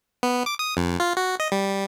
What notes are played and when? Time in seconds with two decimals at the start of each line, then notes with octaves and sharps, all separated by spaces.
0.23 B3
0.46 D6
0.59 D#6
0.77 F2
1.00 F4
1.17 F#4
1.40 D#5
1.52 G3